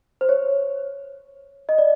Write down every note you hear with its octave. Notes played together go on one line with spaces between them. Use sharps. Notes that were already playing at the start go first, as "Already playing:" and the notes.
C5
C#5
D#5
D5